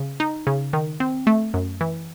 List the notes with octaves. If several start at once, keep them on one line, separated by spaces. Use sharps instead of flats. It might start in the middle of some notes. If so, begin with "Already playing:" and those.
Already playing: C#3
D#4
C#3
D#3
C4
A3
F#2
E3